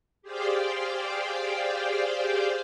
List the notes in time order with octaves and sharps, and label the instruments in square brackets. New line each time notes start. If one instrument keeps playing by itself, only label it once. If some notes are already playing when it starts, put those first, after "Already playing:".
[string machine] G4 G#4 C5 D5 F5 G5